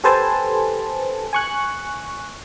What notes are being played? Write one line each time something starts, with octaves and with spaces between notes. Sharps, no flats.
G4 A4 B4 C5 G#5 A5
G#5 C#6 F#6